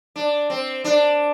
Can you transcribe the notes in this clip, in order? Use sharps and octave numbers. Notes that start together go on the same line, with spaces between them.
D4
C4
D4